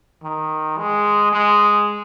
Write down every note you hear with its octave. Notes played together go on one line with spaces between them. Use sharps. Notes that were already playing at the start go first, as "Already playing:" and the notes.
D#3
G#3
G#3